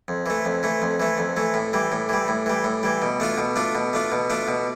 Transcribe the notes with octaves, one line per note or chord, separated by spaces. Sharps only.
F2
E3 A3
F2
E3 A3
F2
E3 A3
F2
E3 A3
A2
E3 G3
A2
E3 G3
A2
E3 G3
A2
E3 G3
B2
A3 D4 F4
B2
A3 D4 F4
B2
A3 D4 F4
B2
A3 D4 F4
B2